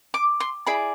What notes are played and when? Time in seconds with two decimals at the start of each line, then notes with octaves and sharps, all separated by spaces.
0.14 D6
0.40 C6
0.66 E4 G#4 D5 B5